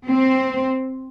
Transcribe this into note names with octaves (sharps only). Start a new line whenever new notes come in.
C4